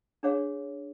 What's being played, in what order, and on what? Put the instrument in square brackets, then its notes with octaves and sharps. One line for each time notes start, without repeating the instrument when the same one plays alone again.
[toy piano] D4 G#4 C#5 F5